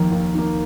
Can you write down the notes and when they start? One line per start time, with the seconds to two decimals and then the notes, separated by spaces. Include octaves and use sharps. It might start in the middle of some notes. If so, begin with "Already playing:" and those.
Already playing: D#2 D#3 F3 A#3
0.11 D#2
0.35 D#3 A#3